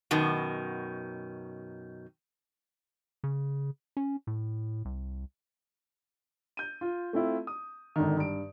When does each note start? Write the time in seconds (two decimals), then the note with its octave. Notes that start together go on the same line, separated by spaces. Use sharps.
0.11 F#2 B2 D#3
3.24 C#3
3.97 C#4
4.27 A2
4.85 C2
6.57 G6 D#7
6.81 F4
7.13 A3 C4 E4 F4
7.47 D#6
7.96 G#1 D3 D#3
8.17 G2 D7